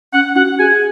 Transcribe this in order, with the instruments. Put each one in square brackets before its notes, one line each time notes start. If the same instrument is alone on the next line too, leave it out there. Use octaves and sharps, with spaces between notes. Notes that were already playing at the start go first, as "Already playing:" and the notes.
[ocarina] C#4 [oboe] F#5
[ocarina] F#4 [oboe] F#5
[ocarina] G#4 [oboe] G#5